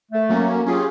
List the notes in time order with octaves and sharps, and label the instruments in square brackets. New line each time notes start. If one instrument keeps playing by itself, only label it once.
[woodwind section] A3
[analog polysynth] F#3 A#3 C#4
[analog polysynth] C#4 F4 G4 [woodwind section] G#4